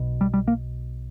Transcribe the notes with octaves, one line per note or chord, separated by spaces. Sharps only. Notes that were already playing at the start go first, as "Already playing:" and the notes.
Already playing: B1 B2
G3
G3
A#3